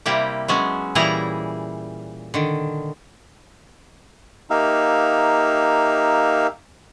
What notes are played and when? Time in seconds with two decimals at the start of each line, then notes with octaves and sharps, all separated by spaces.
0.06 C3 G3 A#3 E4 G4
0.48 F#3 G#3 B3 C#4
0.95 A#2 E3 G3 E4 G#4 A#5
2.34 D3 D#3
4.50 A#3 D#4 G4 E5 F5